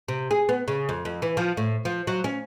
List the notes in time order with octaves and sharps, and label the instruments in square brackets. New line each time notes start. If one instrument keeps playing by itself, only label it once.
[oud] C3
G#4
B3
C#3
F2
F2
E3
F3
A2
F3
F#3
C#4